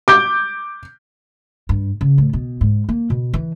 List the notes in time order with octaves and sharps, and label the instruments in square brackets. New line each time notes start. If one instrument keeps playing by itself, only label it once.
[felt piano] D6 G6
[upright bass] G2
C#3
A2
B2
G#2
A#3
B2
E3